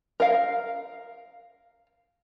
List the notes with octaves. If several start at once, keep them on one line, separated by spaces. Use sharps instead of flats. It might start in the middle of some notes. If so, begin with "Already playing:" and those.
A#4 F5